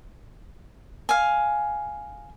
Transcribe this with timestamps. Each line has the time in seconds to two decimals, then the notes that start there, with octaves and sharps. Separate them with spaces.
1.09 F5 G#5